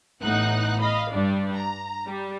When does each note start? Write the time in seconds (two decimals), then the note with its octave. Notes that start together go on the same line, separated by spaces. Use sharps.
0.23 A1 A2 B3 D#4 F#5 F#6
0.81 D#5 F5 B5
1.12 G2 G3 D4
1.56 A#5
2.07 G3